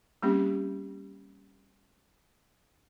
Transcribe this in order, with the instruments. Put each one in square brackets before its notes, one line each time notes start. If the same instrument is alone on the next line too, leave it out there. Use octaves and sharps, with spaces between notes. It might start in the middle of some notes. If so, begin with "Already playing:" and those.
[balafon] G3 A#3 C4 C#4 G4